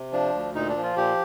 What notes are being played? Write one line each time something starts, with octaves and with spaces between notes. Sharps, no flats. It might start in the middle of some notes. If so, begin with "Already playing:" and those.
Already playing: C3
F3 D4
D2
A#2 D#4
D4
F3
F4
A#2 G4